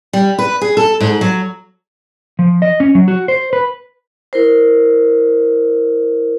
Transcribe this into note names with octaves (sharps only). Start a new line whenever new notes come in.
G3
B4
G#4
A4
G#2
F#3
F3
D#5
C#4
F#3
F#4
C5
B4
E4 A#4 C5